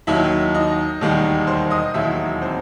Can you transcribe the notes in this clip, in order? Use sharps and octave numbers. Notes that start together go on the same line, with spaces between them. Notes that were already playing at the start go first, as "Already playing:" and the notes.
D#2 D#3 F#3 E4 E5
D#4 D#5
E1 D#2 D#3 G3
C5 C6
D#5 D#6
E1 D#2 D#3 F#3 E4 E5
C4 C5